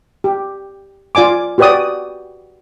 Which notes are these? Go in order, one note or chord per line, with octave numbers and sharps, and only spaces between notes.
G4
F4 D5 G#5 D6
F#4 G4 B4 C#5 D5 D#6